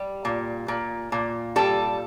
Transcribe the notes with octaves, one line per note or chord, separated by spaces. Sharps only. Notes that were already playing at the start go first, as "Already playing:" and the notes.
Already playing: G3
A#2
A#2
A#2
G3 A4